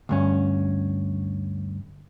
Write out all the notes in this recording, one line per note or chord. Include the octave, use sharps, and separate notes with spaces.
D2 G2 C#4